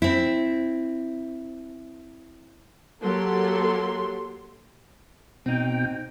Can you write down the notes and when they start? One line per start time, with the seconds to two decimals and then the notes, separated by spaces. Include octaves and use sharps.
0.02 C4 E4
3.02 F#3 A#3 G4 A4 C6
5.46 B2 C4 D#4 G5